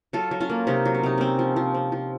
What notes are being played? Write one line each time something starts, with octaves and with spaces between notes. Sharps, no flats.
F#3 F4 A4
F#3
C#4 F4
A#3
C3 C4 D#4
F#3
C#4
C3 D#4
C4 C#4
F3
F3
C4
F3